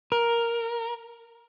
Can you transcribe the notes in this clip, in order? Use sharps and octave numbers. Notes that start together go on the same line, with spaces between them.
A#4